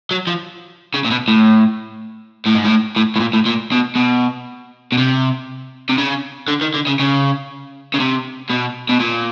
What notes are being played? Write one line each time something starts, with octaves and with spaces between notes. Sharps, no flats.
F#3
F3
C#3
A#2
B2
A2
A2
G#2
A2
A2
A2
A#2
A2
A#2
B2
B2
B2
C3
C3
C#3
D3
D#3
D3
C#3
C#3
C#3
C3
B2
B2
A#2